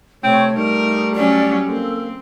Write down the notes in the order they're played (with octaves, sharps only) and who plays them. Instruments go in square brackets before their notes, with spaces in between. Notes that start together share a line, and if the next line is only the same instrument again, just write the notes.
[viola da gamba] C3 [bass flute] A3 [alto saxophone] C4 [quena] C#5
[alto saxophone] G3 [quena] D#4 [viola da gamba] A#4
[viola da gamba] F#3 C#4 [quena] D5
[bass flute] A#3 [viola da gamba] C4 [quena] A4